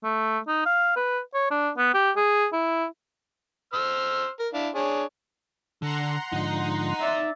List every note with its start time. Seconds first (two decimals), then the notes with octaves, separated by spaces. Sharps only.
0.04 A3
0.48 D#4
0.66 F5
0.96 B4
1.34 C#5
1.51 D4
1.77 B3
1.94 G4
2.16 G#4
2.53 E4
3.73 C5 E6 F6
4.40 A#4
4.54 D4 E4 F5
4.75 D4 G#4 C#5
5.82 D3 F#5 A#5 C6
6.32 G#2 D3 F3 D#4 D#5
7.00 D5 E5